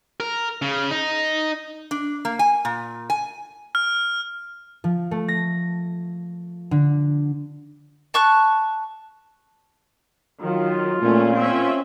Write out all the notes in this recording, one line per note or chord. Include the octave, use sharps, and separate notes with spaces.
A#4
C#3
D#4
D4
A#3
G#5
A#2
G#5
F6
F3
A3
A#6
D3
A5 C#6 F#6
D#3 F#3 F4
A#2 A3 C#4
C4 C#4 E5